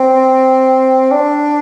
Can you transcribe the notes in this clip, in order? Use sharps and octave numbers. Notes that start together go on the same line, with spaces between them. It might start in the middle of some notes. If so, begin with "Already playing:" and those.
Already playing: C4
D4